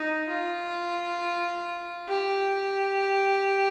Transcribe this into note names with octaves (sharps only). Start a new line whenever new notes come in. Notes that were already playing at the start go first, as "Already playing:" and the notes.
Already playing: D#4
F4
G4